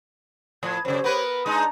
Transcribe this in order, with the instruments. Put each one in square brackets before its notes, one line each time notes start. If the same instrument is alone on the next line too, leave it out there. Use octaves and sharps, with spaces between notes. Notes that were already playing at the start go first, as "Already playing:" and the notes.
[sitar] A2 F3 [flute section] G#6
[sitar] F#2 C#3 [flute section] G4 C5 C#5
[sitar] B3 A#4 B4
[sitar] G#3 D#4 [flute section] D4 A5 A#5